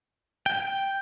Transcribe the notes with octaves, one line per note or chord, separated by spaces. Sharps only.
G5